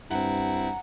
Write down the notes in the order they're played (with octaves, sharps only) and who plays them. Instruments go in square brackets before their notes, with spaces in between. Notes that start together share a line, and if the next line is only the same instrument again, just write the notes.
[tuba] G2 [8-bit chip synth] C4 E4 [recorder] F#5 [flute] A#5